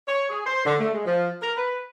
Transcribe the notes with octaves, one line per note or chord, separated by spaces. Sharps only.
C#5
G#4
C5
D3
A3
G#3
F3
A#4
B4